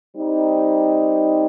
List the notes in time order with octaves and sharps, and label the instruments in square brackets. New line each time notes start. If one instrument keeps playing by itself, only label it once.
[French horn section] G3 C4 D#4